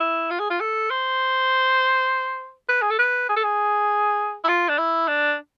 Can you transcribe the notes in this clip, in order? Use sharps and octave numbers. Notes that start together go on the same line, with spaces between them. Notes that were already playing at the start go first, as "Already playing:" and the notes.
E4
F4
G#4
F4
A4
C5
B4
G#4
A4
B4
G#4
A4
G#4
E4
F4
D4
E4
D4